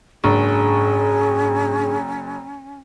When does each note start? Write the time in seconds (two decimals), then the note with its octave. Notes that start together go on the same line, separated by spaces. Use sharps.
0.24 F#1 G#2 C#4 D4 G#4 C#6